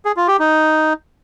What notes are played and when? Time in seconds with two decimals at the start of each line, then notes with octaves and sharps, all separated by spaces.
0.05 G#4
0.17 F4
0.28 G4
0.39 D#4